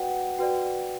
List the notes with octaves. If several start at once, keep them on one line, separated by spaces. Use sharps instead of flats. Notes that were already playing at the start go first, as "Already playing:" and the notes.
Already playing: F#4 B4 D5 F#5 G5
F#4 B4 D5 G5